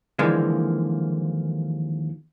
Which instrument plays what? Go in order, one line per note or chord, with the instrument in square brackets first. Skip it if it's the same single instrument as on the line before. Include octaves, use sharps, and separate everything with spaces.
[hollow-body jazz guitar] D#2 D3 E3 F3 G#3 A#3